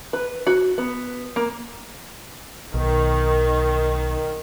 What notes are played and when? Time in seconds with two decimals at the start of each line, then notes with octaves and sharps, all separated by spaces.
0.13 B4
0.47 F#4
0.78 B3
1.36 A#3
2.74 B1 D#3